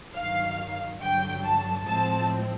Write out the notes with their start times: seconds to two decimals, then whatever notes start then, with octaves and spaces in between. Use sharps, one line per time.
0.15 G2 D#3 F#3 F5
1.00 G2 D3 F#3 G5
1.44 A5
1.87 A2 F3 G#3 C4 A5